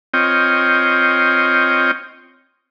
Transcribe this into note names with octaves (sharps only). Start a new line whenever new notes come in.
C4 F4 C#5 D#5 G5